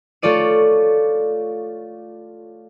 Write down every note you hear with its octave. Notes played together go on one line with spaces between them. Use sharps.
A3 F4 C#5 D5 D#7